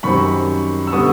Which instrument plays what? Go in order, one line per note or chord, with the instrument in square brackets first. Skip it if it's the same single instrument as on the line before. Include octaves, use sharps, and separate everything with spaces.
[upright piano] F#2 D#3 G3 C4 B5 C#6
E6
D3 G3 B3 C#6 D#6